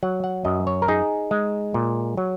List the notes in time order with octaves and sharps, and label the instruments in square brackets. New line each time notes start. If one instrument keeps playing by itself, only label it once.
[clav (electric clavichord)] F#3 F#5
F#5
F#2 D#5
C#5
A#4
D#4 G#4
G#3
A#2
F#3